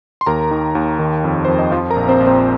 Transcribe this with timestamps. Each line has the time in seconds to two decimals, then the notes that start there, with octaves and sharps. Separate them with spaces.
0.21 C6
0.26 D#2 A#4 A#5
0.51 D#3
0.75 D#2
0.99 D#3
1.24 F2
1.45 F2 C5
1.59 D#5
1.72 F3 F4 F5
1.90 A#4 A#5
1.96 A#1
2.08 C4 C5
2.20 A#1
2.27 C4 C5